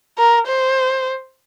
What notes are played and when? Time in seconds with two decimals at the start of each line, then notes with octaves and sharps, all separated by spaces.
0.19 A#4
0.47 C5